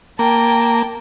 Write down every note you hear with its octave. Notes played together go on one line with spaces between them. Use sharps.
A#3 G5 A5